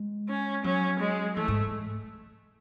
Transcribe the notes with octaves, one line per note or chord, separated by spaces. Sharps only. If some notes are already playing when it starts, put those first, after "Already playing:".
Already playing: G#3
C#4
F#3 C#4
G#3
E3 A3
G#2